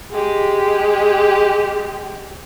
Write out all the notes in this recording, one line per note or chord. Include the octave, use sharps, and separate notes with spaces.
G#3 G4